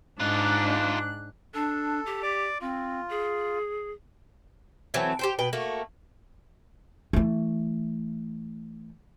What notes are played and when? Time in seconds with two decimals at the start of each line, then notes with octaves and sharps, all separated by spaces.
0.20 G#2 D4 D#4 F4 F#6
1.54 D4 A4
2.06 G4
2.23 D5 D6
2.61 C4 F4
3.09 G#4
4.94 E3 F#3 A3 C4
5.19 G4 C5 G5
5.39 B2 B4 G5
5.53 A3 A#3 F#4
7.13 E3 A3